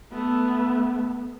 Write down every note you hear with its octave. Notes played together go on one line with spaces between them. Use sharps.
A3 B3